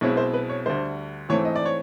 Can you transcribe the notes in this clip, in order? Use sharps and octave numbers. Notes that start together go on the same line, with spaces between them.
B1 B2 G#3 C4 E4 C#5
C5
B4
C#5
D2 D3 G3 C5
G#2 E3 A3 C4 C#5
D#5
D5
C#5